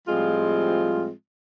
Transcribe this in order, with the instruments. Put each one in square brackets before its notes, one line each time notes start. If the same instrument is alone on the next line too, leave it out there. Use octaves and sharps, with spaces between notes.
[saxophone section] A2 F3 G3 G#3 C4 F4